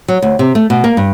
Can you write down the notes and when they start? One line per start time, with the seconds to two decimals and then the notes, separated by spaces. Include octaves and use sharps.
0.08 F#3
0.22 D2
0.39 C3
0.55 A3
0.70 B2
0.84 A#3
0.97 G2